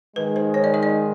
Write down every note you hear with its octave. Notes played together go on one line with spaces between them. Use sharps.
G#2 D#3 G#3 B4
C5
C#5
D5
D#5
D5